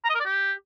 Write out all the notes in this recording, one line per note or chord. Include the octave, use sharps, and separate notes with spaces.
A#5
D#5
A#4
D5
G4